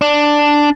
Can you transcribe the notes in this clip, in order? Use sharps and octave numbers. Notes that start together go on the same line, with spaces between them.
D4